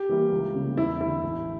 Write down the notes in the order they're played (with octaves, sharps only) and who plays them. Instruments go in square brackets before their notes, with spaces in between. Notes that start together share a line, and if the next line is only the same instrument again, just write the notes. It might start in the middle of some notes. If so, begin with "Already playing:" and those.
Already playing: [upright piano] G4
E3 G3 A#3
C#2
C#3 G3 A#3
E2 E4
D3 A3 E4
A1